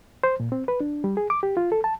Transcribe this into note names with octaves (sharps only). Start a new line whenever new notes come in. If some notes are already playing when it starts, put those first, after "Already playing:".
C5
A#2
C4
B4
D4
G3
G#4
D6
G4
F4
A4
A5